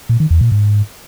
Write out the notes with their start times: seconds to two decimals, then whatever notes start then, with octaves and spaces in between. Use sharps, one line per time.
0.09 A#2
0.20 D#3
0.31 E2
0.41 A#2
0.52 G#2